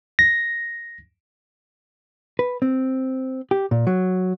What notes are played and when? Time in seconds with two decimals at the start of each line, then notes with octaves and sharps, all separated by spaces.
0.19 A#6
2.39 B4
2.62 C4
3.51 G4
3.71 A#2
3.87 F#3